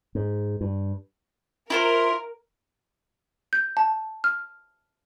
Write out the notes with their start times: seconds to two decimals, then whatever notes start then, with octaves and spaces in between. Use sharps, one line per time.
0.15 G#2
0.61 G2
1.70 E4 F4 A#4 C5
3.53 G6
3.77 A5
4.24 F6